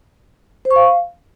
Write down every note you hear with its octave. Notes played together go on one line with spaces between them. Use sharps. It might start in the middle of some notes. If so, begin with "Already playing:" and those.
C5
C#6
F5